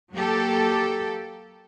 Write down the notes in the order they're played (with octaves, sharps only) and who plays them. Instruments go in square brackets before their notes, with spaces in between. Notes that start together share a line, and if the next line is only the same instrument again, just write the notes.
[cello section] F#3 A#3 G4 A4